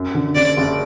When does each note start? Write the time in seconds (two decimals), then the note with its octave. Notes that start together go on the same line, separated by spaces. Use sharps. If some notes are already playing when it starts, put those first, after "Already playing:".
Already playing: F#2
0.15 D3
0.35 F#1 D5
0.57 F#1